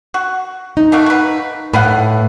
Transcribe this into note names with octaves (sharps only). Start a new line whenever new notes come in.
F#4
D#4
A3 A#3 F#4
F#4 B4
A2 B4 F5 F#5